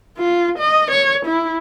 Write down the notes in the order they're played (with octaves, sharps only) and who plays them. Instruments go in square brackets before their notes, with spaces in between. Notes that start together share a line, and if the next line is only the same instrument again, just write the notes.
[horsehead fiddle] F4
D#5
C#5
E4